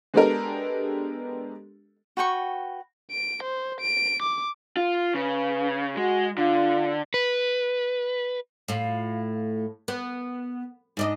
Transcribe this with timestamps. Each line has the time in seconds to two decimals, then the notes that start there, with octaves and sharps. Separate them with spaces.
0.14 G#3 B3 D4 G4 A4 A#4
2.17 F#4 B4 G5 C#6
3.11 D7
3.43 C5
3.81 D7
4.23 D6
4.77 F4
5.14 C#3 B4
5.97 G#3 F#4
6.38 D3 F4
7.14 B4
8.68 A2 F4
9.88 B3
10.97 G#2 D4 D#5